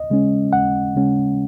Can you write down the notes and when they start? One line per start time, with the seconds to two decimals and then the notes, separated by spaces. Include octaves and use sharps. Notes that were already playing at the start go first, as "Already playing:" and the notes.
Already playing: D#2 D#5
0.10 C#3 G#3 C#4
0.53 D#2 F#5
0.96 C#3 G#3 C#4